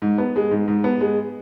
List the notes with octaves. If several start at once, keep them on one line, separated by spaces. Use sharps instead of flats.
G#2
B3
G#3
G#2
G#2
B3
G#3